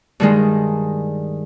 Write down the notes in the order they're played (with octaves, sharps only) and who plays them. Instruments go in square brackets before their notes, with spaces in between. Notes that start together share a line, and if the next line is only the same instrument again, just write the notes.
[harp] G2 D#3 G#3